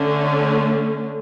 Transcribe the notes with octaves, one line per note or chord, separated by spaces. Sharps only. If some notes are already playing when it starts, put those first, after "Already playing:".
Already playing: D3 A3 C#4